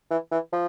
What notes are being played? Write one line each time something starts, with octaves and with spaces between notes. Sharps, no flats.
E3
E3
F3